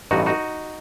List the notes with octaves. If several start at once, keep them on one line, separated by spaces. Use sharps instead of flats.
A1 G2 E3 D#4 F#4
D#4 F#4